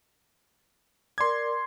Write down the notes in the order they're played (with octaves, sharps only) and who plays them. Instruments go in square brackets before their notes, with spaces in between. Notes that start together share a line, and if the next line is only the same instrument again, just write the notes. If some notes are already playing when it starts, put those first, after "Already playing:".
[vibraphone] A#4 D5 D6 [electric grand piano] C6 G#6